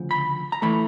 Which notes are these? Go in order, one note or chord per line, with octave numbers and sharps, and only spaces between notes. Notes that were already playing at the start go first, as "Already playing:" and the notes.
Already playing: D2 C#3 F3
B5
A#5
E3 A3 B5